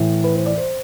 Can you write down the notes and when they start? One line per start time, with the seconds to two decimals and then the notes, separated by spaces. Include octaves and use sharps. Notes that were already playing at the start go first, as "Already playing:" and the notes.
Already playing: A2 E3
0.24 B4
0.35 C5
0.46 D5
0.58 C5